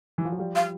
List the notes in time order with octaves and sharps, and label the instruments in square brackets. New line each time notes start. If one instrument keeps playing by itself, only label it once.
[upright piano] E3
F3
F#3
F3 G3
[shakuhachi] F5